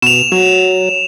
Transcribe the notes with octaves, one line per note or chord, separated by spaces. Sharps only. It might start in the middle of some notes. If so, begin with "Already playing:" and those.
B2 E7 F7
F#3